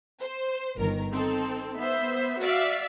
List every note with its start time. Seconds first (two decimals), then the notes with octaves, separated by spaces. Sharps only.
0.20 C5
0.77 G1 D#3 A#4
1.12 C4 D#4 A4
1.77 B3 C5 E5
2.42 F#4 D5 E5 F5 B6